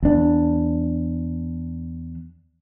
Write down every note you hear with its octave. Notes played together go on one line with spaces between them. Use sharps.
E2 D4